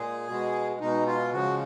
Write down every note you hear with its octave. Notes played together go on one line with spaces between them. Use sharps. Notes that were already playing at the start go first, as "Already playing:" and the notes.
Already playing: A#2 G#3 G#4
B2 G#3
B2 G#3 D#4
F4
C#3 F3 G#3 F#4